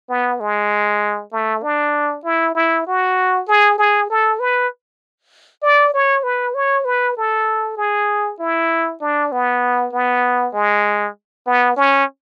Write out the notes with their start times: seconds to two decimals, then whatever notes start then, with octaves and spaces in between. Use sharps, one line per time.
0.09 B3
0.40 G#3
1.32 A3
1.63 D4
2.25 E4
2.55 E4
2.87 F#4
3.48 G#4
3.78 G#4
4.10 A4
4.40 B4
5.62 D5
5.94 C#5
6.24 B4
6.55 C#5
6.85 B4
7.17 A4
7.77 G#4
8.39 E4
9.01 D4
9.32 B3
9.93 B3
10.54 G#3
11.47 B3
11.77 C#4